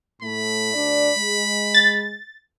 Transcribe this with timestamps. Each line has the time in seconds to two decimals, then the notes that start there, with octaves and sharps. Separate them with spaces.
0.22 A2 A3 B5
0.74 D2 D4 D5
1.18 G#3
1.74 A6